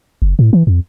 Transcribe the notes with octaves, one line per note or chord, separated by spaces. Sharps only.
F#1
A2
E3
F2